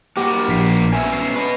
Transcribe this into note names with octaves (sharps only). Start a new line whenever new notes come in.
A#3 F#4 G4
A#1 B6 C7
B2 C#4 E5 G#5
C7
B4 D#5